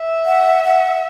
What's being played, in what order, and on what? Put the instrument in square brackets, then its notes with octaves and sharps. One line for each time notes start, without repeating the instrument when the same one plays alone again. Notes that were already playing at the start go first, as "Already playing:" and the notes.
Already playing: [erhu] E5
[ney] F#5
F#5